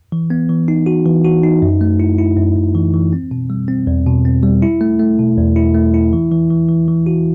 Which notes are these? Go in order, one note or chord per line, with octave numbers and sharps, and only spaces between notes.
E3
B3
E3
D#4
F#4
E3
F#4
D#4
F#2
A3
E4
E4
F#2
F#2
E3
E3
C4
B2
G3
C4
E2
B2
C4
G3
E4
A3
A3
B2
E2
E4
A3
E4
E3
E3
E3
E3
E3
F#4